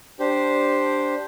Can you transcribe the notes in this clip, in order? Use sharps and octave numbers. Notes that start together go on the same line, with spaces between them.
D4 G4 C5